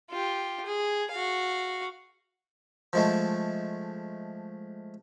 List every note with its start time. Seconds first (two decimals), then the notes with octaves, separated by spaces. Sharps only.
0.10 F4 G4
0.66 G#4
1.12 F#4 F5
2.93 F3 G#3 A3